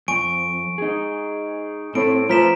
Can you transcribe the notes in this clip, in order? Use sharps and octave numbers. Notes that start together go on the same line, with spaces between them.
F2 G#5 C#6 D7
D#4 G#4
A2 C4 D7
F3 A3 A#4 B4 A#5 B6 E7